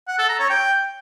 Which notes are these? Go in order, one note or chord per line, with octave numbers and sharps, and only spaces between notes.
F#5
A4
A#5
C#5
G5